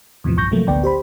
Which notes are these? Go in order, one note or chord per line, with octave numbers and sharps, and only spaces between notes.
E2 A2 C3 E3 F3
B1 G2 C#6 G6 A#6
C3 F3 F#3 A3 A#3
A1 D2 D3 B3 D5 G5
G4 C5 B5